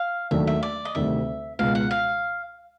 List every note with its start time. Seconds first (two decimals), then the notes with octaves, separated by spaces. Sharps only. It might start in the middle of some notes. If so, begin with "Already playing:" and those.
Already playing: F5
0.31 D#2 D#3 F#3 A3 D4 E5
0.47 E5
0.63 D5
0.85 D#5
0.95 D2 C3 D#3 G3 E5
1.59 C#2 B2 G#3 F5
1.75 F#5
1.91 F5